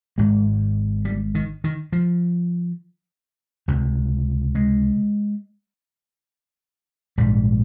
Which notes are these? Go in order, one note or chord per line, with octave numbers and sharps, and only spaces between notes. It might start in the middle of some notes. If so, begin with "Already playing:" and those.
G#1 G#2 G#3
G3
D#3
D#3
F3
C#2 C3
G#3
A#1 G#2 G3